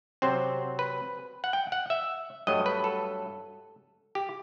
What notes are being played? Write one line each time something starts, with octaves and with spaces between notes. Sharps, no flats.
C3 F#3 C4 C5
B4
F#5
G5
F#5
E5
G2 F#3 A3 D#5
B4
A4
G4